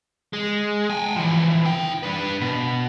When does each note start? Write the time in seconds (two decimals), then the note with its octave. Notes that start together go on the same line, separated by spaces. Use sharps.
0.33 G#3
0.90 G5 G#5
1.16 E3 F3
1.65 E4 G5
2.03 D4 B4
2.41 B2